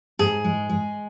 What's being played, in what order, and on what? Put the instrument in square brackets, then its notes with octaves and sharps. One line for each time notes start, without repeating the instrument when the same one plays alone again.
[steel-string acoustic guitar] G#2 [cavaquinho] G#4
[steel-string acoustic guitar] G#3
G#3